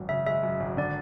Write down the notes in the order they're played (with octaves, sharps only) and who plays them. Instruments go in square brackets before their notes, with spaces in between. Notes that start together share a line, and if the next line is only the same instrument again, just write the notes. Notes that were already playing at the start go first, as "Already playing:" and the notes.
Already playing: [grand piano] G#1 F#2
[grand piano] C#3 [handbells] E5
[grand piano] G#3 [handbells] E5
[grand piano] F#2
G#1
[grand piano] D3 [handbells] D5